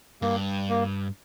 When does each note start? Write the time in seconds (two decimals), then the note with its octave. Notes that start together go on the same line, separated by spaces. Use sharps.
0.22 G2 A#3
0.69 A#3